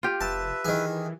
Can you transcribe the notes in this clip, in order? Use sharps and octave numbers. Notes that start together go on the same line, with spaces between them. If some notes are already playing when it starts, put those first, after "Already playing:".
F4 G4
F1 B4 E5 A5
D#3 E3 G#4